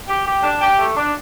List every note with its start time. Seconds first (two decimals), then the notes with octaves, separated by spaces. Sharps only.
0.08 G4
0.26 G4
0.43 D4
0.61 G4
0.79 A3
0.97 D4